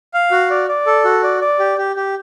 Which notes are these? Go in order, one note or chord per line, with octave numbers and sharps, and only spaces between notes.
F5
F#4
D5
D5
A4
F#4
D5
D5
G4
G4
G4